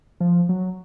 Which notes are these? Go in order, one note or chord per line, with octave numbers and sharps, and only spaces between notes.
F3
F#3